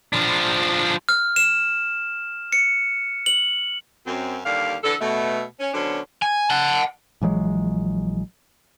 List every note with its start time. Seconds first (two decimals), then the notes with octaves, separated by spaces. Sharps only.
0.13 F3 D4
1.09 F6
1.36 E7
2.52 C#7
3.26 F#7
4.07 F#2 C4
4.45 D#2 D3 G3 D5 F5
4.84 D3 E3 D4 A4
5.01 B2 A3
5.60 C#4
5.74 B2 D3 F#3 C#4 D4 C5
6.22 G#5
6.50 F#5 A5
7.22 A#1 E3 F#3 G#3